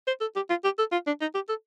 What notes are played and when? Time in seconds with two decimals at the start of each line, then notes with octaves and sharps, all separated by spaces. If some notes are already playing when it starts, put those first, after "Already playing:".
0.07 C5
0.21 A4
0.36 G4
0.50 F4
0.64 G4
0.78 A4
0.92 F4
1.07 D4
1.21 D#4
1.35 G4
1.49 A4